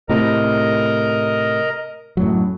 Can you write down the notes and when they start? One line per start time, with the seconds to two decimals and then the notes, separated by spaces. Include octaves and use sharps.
0.09 A2 C3 A#4 D#5 A#5
2.17 F#2 A2 F#3